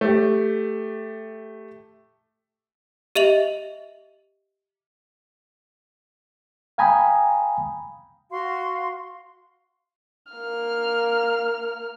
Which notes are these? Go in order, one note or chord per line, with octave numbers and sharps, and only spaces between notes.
A3 G4
G4 D#5 E5 F7 F#7
F5 G5 G#5 A#5 B5 D#6
F#4 F5 C6
A#3 F6